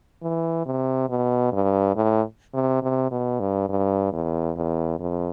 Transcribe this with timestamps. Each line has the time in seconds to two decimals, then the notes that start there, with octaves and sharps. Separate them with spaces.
0.23 E3
0.66 C3
1.09 B2
1.52 G2
1.96 A2
2.54 C3
2.83 C3
3.11 B2
3.40 G2
3.69 G2
4.12 E2
4.56 E2
5.00 F2